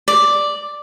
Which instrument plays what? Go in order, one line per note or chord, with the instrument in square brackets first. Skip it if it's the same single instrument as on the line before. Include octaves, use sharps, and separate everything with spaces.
[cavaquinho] D5